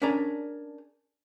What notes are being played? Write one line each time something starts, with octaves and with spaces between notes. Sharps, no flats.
C#4 D4 G#4 A#4 D5 A#5